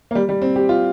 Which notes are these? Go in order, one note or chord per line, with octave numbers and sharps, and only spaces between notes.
A#3
G3
G3
C4
G4
F4